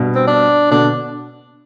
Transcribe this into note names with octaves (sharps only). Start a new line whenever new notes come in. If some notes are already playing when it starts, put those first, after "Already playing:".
Already playing: G2 B2
C4
D4
B2 D3 D4